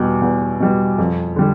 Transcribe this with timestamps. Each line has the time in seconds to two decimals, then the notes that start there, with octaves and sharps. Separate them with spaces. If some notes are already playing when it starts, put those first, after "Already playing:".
Already playing: E2 B2 G3
0.22 E2
0.60 B2 G3
0.98 F2
1.36 D3 G3